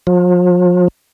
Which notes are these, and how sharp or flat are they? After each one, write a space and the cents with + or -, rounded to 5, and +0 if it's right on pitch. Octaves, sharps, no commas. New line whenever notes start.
F3 +40